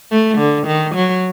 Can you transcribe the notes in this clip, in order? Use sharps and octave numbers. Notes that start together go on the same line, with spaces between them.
A3
D3
D#3
F#3